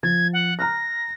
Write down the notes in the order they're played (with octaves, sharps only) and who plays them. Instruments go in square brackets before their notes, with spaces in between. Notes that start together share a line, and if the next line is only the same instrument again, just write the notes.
[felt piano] F3 A6 [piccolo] G#6
[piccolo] F#5
[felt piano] A#5 F6 F#6 [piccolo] A#6